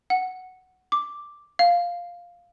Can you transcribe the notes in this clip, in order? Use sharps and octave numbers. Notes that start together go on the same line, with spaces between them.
F#5
D6
F5